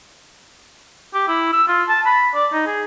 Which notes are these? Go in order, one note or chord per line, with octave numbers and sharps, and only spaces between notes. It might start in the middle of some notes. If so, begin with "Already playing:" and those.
G4
E4
E6
F4
A5
B5
D5
D#4
G#4